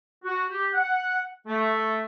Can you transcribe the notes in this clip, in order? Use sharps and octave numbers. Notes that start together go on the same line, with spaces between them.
F#4
G4
F#5
A3